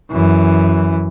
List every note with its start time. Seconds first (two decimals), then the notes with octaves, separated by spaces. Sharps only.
0.12 F#2 E3